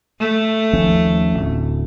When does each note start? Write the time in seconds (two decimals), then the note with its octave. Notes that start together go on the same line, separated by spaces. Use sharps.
0.20 A3
0.73 D#2 F3 C#4
1.34 D1